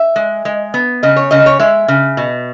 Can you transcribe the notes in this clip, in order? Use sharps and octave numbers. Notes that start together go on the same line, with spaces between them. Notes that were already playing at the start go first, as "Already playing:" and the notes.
Already playing: E5
G#3
G#3
B3
C#3 D#5
C#5
C#3 D#5
C#5
G#3 E5
C#3
B2